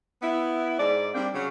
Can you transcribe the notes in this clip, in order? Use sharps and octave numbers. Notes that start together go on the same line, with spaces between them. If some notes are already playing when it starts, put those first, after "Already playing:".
B3 E4
G#2 D5
G3 A#3 C4 D4
C#3 F#3